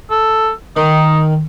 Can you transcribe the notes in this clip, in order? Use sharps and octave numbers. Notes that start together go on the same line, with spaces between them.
A4
D#3 D#4